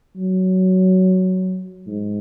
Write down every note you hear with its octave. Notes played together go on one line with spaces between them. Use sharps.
F#3
G#2